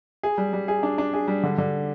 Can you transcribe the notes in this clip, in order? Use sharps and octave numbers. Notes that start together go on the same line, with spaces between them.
G#4
G3
G3
G#4
D4
D4
G#4
G3
D3
D3